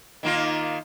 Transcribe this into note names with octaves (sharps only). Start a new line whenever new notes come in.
D#3 A#3 F4